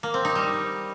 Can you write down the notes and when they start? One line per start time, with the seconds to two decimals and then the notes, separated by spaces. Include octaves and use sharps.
0.03 A#3
0.14 C4
0.25 D#4
0.35 G3